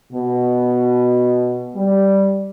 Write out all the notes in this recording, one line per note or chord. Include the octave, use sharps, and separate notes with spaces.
B2
G3